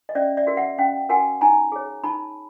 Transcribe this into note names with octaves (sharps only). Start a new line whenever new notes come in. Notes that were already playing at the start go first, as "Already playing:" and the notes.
D#5
C#4 D5 E5
D5 E5
F#4 A#4
E5 F#5
C#4 F5 G5
F#4 A#4 F#5 G#5
D#4 G#5 A#5
G#4 C#5
D#4 A5 B5